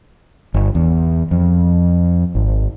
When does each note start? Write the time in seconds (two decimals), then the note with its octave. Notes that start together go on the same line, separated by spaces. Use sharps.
0.54 G1
0.75 E2
1.31 F2
2.35 G#1